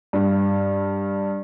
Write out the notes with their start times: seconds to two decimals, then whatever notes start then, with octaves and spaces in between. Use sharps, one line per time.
0.13 G2